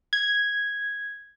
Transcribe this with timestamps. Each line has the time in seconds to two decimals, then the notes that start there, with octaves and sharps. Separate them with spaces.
0.13 G#6